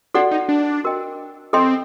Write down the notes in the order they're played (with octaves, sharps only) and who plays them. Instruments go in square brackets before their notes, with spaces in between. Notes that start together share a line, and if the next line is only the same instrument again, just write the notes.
[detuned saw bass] D4 [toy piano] F#4 A4 D5 F#5
[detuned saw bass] D#4
D4
[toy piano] F#4 A#4 D#5 G5
[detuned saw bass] C4 [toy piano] A4 D#5 G5 C6